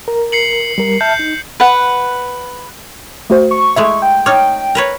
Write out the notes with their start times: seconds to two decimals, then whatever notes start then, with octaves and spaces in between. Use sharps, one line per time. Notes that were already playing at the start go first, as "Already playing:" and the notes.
0.08 A#4
0.32 C7 C#7 F#7
0.78 G3 A#4
1.01 E5 A5 F6 G6
1.19 D#4
1.60 B4 F#5
3.30 A3 F#4 C5
3.51 C#6
3.76 G#3 A3 E4 E5
4.02 G5
4.26 D#4 C#5 D6 F6 A6
4.75 A#4 B4 C#5